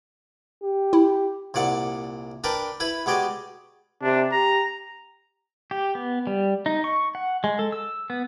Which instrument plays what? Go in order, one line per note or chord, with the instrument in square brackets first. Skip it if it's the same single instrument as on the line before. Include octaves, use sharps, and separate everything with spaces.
[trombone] G4
[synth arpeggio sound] E4
[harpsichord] C2 A#2 D5 F#5
D4 A#4 B4 D5 G5
E4 B4 B5
B2 G#3 G4 D5 D#5
[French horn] C3 [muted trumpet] D4
[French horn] G4 [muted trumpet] A#5
[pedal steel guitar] G4
B3
G3
D#4
C#6
F#5
G#3
A4
E6
B3